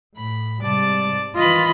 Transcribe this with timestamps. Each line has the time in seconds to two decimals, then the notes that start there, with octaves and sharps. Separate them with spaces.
0.17 A2 B5
0.62 G#2 C3 G3 D5 A5
1.35 D#3 E3 F4 D#5 B5